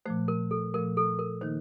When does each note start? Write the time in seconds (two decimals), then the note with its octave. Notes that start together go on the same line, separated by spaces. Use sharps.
0.06 A#2 F3 A3 C5
0.28 A#4
0.51 A4
0.74 A#2 F3 A3 A#4
0.97 A4
1.19 A#4
1.41 D#3 A#3 D#4 C5